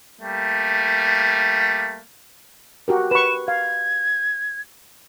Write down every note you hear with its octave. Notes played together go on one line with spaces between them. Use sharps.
G3 A3 A#3
F#4 G4 A#4
B4 C#6 E7
F5 G#6